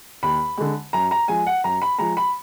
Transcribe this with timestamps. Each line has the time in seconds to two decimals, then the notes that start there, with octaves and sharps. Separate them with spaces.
0.23 D#2 B5
0.58 D3 G#3
0.93 F#2 A#5
1.11 A#5
1.28 F3 G#3 G#5
1.46 F#5
1.64 F#2 A#5
1.82 B5
1.99 F3 G#3 A#5
2.17 B5